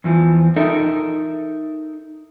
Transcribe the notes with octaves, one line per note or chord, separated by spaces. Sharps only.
E2 E3 F3
D#4 A4 A#4 D#5 E5